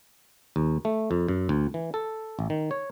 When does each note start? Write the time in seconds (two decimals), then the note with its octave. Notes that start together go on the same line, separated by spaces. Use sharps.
0.56 D#2
0.85 A3
1.11 F2
1.28 F#2
1.49 D2
1.74 E3
1.94 A4
2.39 A1
2.50 D#3
2.71 C#5